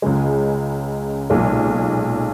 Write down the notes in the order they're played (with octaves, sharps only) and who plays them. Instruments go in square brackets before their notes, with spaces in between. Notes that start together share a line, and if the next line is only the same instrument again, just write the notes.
[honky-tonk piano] C#2 C#3 G#3
B1 A#2 G#3